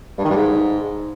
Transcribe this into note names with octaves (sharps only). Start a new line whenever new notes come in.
G2
D#3
G2
G#2